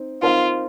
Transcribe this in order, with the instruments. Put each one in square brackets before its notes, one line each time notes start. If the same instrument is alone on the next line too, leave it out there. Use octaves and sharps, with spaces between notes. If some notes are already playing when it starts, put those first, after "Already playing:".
Already playing: [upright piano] C4 D#4
[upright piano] C4 D#4 A#4 F5 [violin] F4